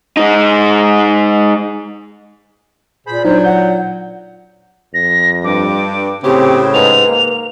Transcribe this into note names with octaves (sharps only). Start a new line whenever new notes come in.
G#3 D#4
A#2 G#4 C5 B5
F#3 D4 D#4 C5
F#5 G6
F2 A#6
G2 D6
A2 C#3 C4 G4 D6
G#2 B4 F7
A#3